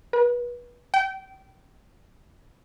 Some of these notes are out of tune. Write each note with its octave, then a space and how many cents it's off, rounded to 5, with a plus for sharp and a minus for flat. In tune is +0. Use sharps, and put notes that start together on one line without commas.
B4 -30
G5 -25